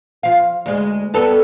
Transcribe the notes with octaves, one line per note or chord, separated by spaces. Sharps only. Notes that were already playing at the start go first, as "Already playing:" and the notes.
F3 F5
D2 G#3
G3 B3 A4